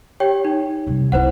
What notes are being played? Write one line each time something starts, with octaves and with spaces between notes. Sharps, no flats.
G4 C#5 G5
D#4
C3 G3
C2 E4 B4 C5 F#5